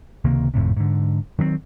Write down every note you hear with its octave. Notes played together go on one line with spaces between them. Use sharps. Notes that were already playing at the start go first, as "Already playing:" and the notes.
C#2 C3 D#3 A#3
G#1 F2 A2 C3
G#2 D3
D#3 F#3 G#3 C4